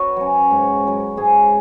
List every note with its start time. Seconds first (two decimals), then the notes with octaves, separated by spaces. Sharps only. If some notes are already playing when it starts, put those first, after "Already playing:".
Already playing: F#4 B4 C#5
0.17 F#3 C#4
0.51 G#2
0.85 F#3 C#4
1.17 G#2 G#4 C#5